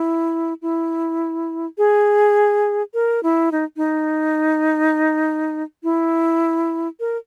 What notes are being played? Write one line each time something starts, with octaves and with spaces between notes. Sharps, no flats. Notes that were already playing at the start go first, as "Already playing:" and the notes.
Already playing: E4
E4
G#4
A#4
E4
D#4
D#4
E4
A#4